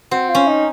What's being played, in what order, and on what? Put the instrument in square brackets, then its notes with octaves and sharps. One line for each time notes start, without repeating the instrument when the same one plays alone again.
[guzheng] C4 [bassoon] F#4
[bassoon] F4
[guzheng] C#4
[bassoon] D#4